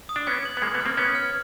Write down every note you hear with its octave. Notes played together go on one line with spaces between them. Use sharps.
D#6
D4
B3 C#4 G#6
F#7
B3
G#3 A#3 G#6
A3 B3
F6
A#3 C4
B3 C#4 G#6
F6